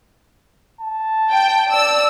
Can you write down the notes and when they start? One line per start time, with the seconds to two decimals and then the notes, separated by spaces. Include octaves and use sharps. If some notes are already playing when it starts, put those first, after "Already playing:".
0.80 A5
1.33 G5
1.71 D5 E6